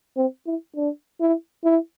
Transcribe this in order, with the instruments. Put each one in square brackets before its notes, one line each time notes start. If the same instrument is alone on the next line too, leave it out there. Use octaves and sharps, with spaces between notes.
[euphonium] C4
E4
D4
E4
E4